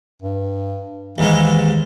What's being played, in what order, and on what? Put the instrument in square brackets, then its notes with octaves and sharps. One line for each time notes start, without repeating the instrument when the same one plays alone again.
[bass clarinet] G2
[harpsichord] D#2 G#2 G#3 [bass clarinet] E3